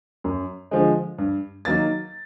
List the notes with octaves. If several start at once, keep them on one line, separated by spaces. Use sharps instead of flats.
F#2
D3 F3 G#3
G2
D#3 F#3 A#3 A6